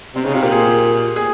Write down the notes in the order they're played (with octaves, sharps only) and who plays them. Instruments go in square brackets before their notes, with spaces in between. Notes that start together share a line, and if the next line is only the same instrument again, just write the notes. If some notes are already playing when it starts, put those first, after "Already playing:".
[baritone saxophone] C3 [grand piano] C4
[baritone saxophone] C#3 [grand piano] D#4
[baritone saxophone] C3 [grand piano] F4
[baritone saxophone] A#2 [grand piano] G4
[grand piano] G#4
G#4